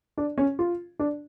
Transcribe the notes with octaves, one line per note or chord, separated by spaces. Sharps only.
D4
C#4
F4
D4